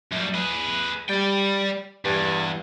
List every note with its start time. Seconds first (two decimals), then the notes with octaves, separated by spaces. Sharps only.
0.12 F#2 G3
0.34 G#4 B4
1.09 G3 D5 G5
2.05 E2 G2